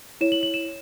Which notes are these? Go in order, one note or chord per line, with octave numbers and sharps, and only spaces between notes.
E4 C#5 E7
F#7
F#7
E7
C#5